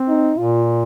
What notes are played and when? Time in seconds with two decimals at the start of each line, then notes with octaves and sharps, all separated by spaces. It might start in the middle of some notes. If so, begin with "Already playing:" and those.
Already playing: C4
0.08 D#4
0.38 A#2 F4